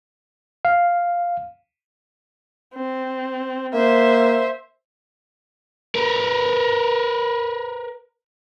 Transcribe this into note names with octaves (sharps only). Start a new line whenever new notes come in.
F5
C4
A#3 C5 E5
A#4 B4